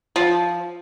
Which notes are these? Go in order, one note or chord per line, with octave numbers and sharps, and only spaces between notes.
F3